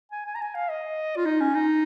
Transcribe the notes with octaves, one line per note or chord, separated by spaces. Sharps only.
G#5
G#5
A#5
G#5
F5
D#5
F4
D#4
C#4
D#4